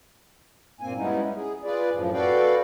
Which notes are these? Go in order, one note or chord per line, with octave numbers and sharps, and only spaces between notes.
G2 A#2 A#3 C4 G#5
G3 G#3 B3 C#4 D#4 E4
G#4
F4 G#4 B4 D5
F#2 A2 C#3 F3
F#4 A4 B4 D5 F5 G5